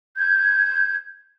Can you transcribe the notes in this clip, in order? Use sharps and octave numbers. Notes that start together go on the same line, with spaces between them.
G6 G#6